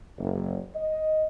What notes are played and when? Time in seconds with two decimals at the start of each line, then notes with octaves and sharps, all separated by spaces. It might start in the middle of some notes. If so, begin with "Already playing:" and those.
0.18 F#1
0.75 D#5